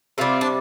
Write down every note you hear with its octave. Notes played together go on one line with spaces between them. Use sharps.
C3 G3 C4 F4
D4